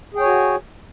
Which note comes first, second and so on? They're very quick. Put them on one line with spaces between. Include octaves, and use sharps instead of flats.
G#4 G5 C#5 G#5 F#4